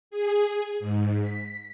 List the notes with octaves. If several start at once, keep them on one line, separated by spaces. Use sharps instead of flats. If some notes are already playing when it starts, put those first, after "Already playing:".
G#4
G#2
B6